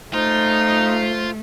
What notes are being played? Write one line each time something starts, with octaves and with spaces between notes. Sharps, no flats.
A3 D#4 F4 C5